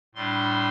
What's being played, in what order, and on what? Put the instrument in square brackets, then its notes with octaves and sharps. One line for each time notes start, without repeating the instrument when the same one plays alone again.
[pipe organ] A2 G3 D4 C6